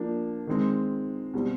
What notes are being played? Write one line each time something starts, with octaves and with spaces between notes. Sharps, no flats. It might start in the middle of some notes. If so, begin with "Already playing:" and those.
Already playing: F3 A#3 D4
D#3 G#3 C4
B2 G3 C4